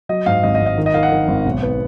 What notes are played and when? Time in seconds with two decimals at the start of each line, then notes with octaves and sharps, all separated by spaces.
0.09 F#3 D#5
0.26 G#2 F5
0.43 G#1 D#5
0.55 D#5
0.61 G#1
0.66 D#5
0.78 D#3
0.86 D#5
0.94 D#3 F5
1.03 F#5
1.12 D#3
1.28 G#1
1.46 B1
1.62 B3